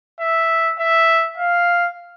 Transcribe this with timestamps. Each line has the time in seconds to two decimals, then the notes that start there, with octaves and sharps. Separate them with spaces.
0.20 E5
0.79 E5
1.37 F5